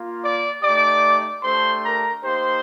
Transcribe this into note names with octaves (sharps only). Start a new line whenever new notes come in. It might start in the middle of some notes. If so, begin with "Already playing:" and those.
Already playing: A#3 F4
D5 D6
A3 D#4 G4 D5 D6
A3 D4 G4 C5 C6
A#4 A#5
A#3 D#4 G4 C5 C6